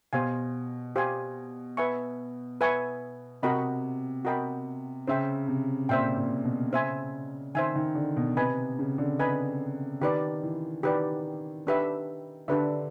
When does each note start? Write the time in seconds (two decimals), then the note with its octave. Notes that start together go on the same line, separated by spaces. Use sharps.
0.13 B2 G4 C5 F5 G#5
0.96 G4 C5 F5 G#5
1.77 B4 E5 G#5 C#6
2.61 B4 E5 G#5 C#6
3.43 C3 F#4 A#4 D#5 G5 B5
4.25 F#4 A#4 D#5 G5 B5
5.07 C#3 C5 E5 G5
5.48 C3
5.89 A#2 C5 E5 G5
6.17 A#2
6.44 B2
6.72 C#3 C5 E5 G#5
7.54 D#3 C5 E5 G#5
7.75 D#3
7.95 D3
8.16 B2
8.37 C3 B4 D#5 G#5 B5
8.79 C#3
8.98 D3
9.19 B4 D#5 G#5 B5
10.01 D#3 G4 B4 D5
10.43 E3
10.83 D#3 G4 B4 D5
11.67 D4 G4 B4 E5
12.48 D3 D4 G4 B4 E5